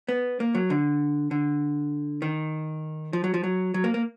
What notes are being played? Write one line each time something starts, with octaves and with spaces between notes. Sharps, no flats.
B3
A#3
F#3
D3
D3
D#3
F3
F#3
F3
F#3
F#3
A#3
A#3